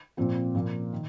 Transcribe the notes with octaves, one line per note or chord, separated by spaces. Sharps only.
A#2 F3 C4 F4
A#2 F3 A#3
D#3